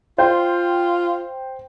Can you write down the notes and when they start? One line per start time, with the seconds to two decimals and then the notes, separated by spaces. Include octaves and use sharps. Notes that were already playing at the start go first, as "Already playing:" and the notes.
0.18 F4 C5 G5 G6